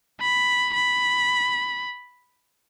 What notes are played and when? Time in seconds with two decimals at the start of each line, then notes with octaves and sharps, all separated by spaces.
0.21 B5
0.74 B5